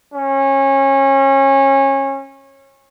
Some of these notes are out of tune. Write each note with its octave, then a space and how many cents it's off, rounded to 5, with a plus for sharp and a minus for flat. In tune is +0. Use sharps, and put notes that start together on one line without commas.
C#4 -25